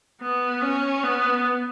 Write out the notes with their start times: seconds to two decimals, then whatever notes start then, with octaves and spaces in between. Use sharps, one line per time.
0.21 B3
0.62 C#4
1.03 B3